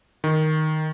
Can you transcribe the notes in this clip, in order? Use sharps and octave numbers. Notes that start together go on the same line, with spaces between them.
D#3